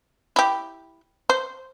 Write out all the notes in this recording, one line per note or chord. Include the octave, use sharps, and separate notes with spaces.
E4 G4
C5